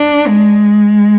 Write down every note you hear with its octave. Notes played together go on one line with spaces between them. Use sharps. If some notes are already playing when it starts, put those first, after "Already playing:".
Already playing: D4
G#3